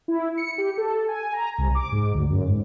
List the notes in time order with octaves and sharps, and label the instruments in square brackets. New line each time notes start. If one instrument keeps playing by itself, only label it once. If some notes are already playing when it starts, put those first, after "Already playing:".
[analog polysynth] E4
C#7
G4
A4
G#5
A#5
C2
D6
G#2
D2
F#2
G#2